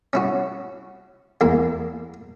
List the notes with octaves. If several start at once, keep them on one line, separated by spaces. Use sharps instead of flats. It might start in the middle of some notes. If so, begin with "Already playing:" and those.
C#4 E4 F#4
E2 A#3 E4